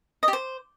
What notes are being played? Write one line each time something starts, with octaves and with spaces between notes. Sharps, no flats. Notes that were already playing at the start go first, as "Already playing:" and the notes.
D#5
G4
C5